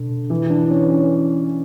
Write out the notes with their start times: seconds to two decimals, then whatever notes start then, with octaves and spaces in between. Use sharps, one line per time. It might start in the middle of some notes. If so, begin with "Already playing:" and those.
Already playing: B2 D3
0.30 E3
0.50 D4
0.70 C#4
0.91 C#4